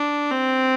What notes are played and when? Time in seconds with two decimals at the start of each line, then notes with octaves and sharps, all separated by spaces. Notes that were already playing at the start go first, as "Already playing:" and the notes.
Already playing: D4
0.31 C4